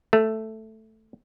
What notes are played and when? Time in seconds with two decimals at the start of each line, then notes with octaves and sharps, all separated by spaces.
0.13 A3